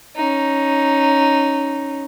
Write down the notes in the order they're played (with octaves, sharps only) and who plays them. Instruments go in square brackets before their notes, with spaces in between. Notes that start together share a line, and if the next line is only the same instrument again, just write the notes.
[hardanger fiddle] C#4 D#4